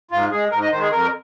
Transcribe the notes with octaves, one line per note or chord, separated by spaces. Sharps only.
G#2 F4
G#3 G#4
G#2 A#4
D#5
D#3 G#3 C5
G#4
F2 A#4